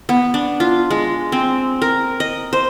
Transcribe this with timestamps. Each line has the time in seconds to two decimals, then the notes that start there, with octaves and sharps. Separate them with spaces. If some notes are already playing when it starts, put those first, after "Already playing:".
0.09 B3
0.34 D4
0.60 F4
0.90 G#3
1.32 C4
1.82 A#4
2.20 D#5
2.53 C5